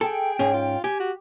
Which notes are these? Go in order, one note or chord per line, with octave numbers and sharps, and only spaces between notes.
G#4 A4 G5
G#2 C#4 G#4
F4
G4 G#5
F#4